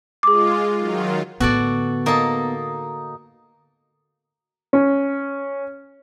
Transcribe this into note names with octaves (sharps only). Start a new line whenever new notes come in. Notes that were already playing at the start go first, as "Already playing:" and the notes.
G#3 F4 G#4 D6
D#3 F#3 F4
A2 D3 B3 F#4 A4 D5
A#3 D#4 A4 D#6
C#4